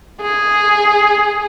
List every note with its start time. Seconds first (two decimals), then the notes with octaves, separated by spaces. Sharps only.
0.22 G#4